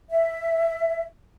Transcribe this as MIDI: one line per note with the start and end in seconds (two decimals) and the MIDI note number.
0.10 1.03 76